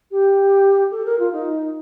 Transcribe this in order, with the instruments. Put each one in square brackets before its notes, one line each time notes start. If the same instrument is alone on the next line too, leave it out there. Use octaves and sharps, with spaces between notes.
[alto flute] G4
A4
A#4
F4
D#4